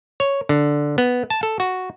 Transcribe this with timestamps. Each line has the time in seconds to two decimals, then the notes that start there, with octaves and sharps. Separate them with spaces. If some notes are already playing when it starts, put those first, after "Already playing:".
0.20 C#5
0.49 D3
0.98 B3
1.30 A5
1.43 A4
1.60 F#4